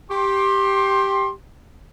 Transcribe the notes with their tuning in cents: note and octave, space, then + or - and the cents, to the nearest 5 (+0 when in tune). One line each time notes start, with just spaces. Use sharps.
G4 +0 C6 +25